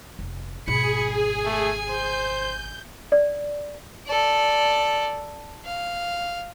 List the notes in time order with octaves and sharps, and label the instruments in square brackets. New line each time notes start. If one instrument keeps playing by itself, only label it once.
[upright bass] F1
[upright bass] G#1 B2 [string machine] G#4 [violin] B5 C#7
[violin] G#5
[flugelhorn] A3
[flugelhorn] C5 [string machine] G6
[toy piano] D5
[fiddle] A4 D5
F5